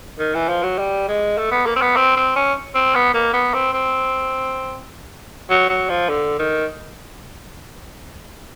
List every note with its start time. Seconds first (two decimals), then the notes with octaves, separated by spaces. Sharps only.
0.19 D#3
0.34 E3
0.49 F3
0.63 F#3
0.78 G3
1.08 G#3
1.37 A3
1.51 B3
1.66 A#3
1.76 C4
1.82 B3
1.96 C4
2.16 C4
2.36 C#4
2.75 C4
2.95 B3
3.14 A#3
3.33 B3
3.54 C4
3.73 C4
5.50 F#3
5.69 F#3
5.89 F3
6.09 D3
6.39 D#3